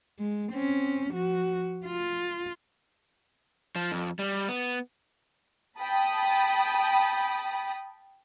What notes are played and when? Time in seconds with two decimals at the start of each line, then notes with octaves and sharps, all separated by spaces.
0.19 G#3
0.52 C4 C#4
1.10 F3 F#4
1.86 F4
3.76 F3
3.92 F2
4.19 G3
4.48 B3
5.80 G5 A5 B5 D#6